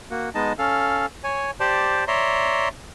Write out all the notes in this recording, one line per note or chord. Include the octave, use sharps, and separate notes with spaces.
A#3 F#4
G#3 B3 D#4 D#5 A5
C#4 A4 F5
C#5 G#5
G4 C5 D5 A5
C#5 D5 E5 A#5 C6